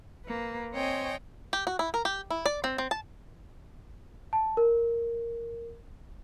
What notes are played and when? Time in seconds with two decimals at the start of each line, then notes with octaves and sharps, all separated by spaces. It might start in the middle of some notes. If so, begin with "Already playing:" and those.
0.24 A#3 B4
0.72 C4 C5 C#5 D#5 G5 G#5
1.53 G4
1.67 F#4
1.79 E4
1.94 A#4
2.05 G4
2.30 E4
2.46 D5
2.64 C4
2.78 C4
2.91 A5
4.33 A5
4.57 A#4